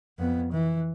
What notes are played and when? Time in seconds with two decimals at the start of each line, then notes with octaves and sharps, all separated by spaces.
0.19 F2 B3
0.52 E3